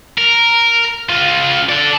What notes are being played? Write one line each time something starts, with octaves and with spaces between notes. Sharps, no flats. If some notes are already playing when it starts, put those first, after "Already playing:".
A#4
C#2 F4
A4 D5